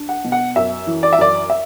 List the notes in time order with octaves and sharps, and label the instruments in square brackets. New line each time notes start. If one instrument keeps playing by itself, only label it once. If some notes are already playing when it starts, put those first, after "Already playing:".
Already playing: [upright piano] D4
F#5
B2
F#5
F#2 E5
E3
D5
E5
F#2 D5
E5